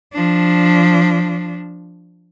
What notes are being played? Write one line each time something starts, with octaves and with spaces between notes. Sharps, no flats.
F3 D4